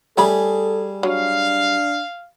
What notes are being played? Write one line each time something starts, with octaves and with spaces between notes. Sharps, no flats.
G3 A3 C#4 G#4 A4 B5
F#3 D4 F5